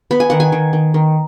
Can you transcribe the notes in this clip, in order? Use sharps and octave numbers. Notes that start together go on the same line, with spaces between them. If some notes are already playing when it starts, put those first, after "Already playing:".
B3 B5
G#5
D#3 F#5
G#5
D#3
D#3
D#3